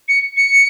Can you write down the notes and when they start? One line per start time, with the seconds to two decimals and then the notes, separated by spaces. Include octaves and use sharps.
0.08 C#7
0.37 C#7